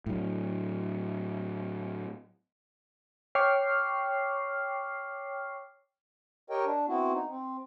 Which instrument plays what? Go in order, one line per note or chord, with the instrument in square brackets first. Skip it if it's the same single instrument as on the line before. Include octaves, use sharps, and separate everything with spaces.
[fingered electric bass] A2 F#3
[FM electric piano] C#5 G5 C#6 D6 F6 C7
[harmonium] G4 A#4 C#5 D#5 G5
D4
B3 C4 E4 F#4
D#4
C4